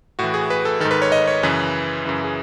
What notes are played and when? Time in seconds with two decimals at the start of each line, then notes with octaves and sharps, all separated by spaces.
0.19 A2 E3 F#4
0.34 G#4
0.50 B4
0.65 A4
0.80 G#2 D#3 A4
0.91 B4
1.02 C#5
1.12 D#5
1.27 C#5
1.43 F#2 C#3 E3 B4
2.05 F#2 C#3 E3
2.24 G#4